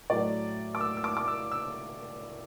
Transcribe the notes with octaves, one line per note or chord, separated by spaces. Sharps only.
A2 F#3 A3 D5
D6
E6
E6
D6
D6
E6
E6